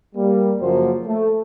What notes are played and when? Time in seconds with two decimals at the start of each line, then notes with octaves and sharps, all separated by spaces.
0.15 G3 A#3
0.60 F#2 C#3 F3 A#3 F#4 C5
1.06 A3